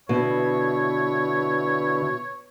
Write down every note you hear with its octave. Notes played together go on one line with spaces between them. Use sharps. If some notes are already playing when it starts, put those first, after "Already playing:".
B2 D3 B3 E4 C#5